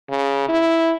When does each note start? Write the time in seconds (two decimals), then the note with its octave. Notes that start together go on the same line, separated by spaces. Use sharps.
0.10 C#3
0.49 E4